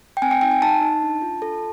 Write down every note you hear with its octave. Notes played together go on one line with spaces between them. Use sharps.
G5
C4 G#5
G5
D#4 G5
G#5
D#4 A5
D#4
D4
F4
A4